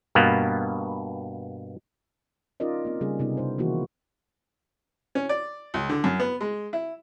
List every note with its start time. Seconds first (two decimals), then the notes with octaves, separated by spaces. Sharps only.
0.15 G2 B2 A#3 B3
2.60 C#4 D#4 F4 A#4 D5 D#5
2.85 A#3 C4
3.01 C#3 G3 A#3 C#4 G#4
3.19 C3 B3 D#4
3.37 C3 D4 C5
3.58 D#3 E3 A#3 E4 F#4
5.15 C#4
5.29 D5
5.74 C#2
5.89 D3
6.04 F#2
6.20 B3
6.41 G#3
6.73 E4